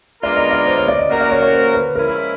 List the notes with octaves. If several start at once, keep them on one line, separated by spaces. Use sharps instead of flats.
G#3 B3 D4 F4 A#4 D5
D#5
D5
C5
C#5
D5
D#5
A#3 C#4 F#4 A#4
D5
C#5
C#5
C5
B4
F3 G#3 C#4 E4 A#4